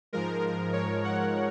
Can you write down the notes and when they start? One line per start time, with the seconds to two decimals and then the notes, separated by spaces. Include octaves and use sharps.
0.13 G#2 F3 G#3 A#4
0.73 C#5
1.04 F#5